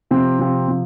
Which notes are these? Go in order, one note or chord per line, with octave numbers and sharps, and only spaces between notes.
C3 F3 C4
C3 F3 C4
C3 F3